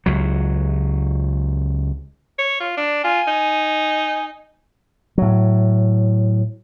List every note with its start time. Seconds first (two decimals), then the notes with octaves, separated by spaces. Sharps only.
0.06 C#2 F#3
2.39 C#5
2.60 F4
2.77 D4
3.04 F4 G#5
3.27 D#4
5.18 A2 F#3